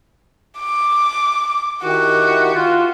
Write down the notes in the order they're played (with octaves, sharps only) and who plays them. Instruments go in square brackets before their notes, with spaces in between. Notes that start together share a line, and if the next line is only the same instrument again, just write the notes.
[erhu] D6
[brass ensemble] D#3 E4 G4 [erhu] F#4
[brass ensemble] F4